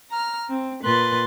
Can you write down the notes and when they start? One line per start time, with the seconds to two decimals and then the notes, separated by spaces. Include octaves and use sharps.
0.10 A#5 F6
0.49 C4
0.84 A#2 B4 C6 F#6 A6